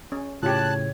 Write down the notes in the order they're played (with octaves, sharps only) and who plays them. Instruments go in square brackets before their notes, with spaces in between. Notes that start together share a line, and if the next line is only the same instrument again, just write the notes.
[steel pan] C#4
[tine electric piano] A2 C#3 [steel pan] F4 G4 [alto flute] C#5 [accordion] A5 F#6